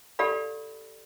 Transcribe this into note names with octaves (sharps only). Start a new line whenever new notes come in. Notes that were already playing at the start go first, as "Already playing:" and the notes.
G4 A4 D5 F5 B5